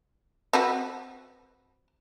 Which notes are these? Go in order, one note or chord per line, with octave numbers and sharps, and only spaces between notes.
C4 F#4 B4